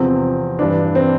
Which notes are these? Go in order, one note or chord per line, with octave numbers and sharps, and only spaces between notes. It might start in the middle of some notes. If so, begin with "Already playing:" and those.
Already playing: E2 C3 F3 C4
G2 E3 D4
C4